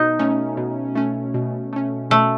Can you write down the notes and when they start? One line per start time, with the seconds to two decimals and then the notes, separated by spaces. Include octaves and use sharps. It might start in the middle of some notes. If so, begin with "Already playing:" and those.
Already playing: B2 D#4
0.19 A3 C#4
0.57 B2
0.95 A3 C#4
1.34 B2
1.73 A3 C#4
2.10 B2 A3